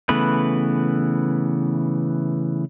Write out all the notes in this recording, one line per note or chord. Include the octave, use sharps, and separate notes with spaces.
C#3 E3 A3 B3 B4